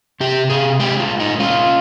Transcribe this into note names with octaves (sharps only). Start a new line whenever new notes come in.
C3 G4
C3 G#4
G#3 G4
F4
A#2
D#4
C#4 F4